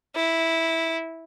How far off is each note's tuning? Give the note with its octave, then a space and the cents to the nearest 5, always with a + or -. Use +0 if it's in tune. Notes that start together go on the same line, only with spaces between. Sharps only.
E4 -10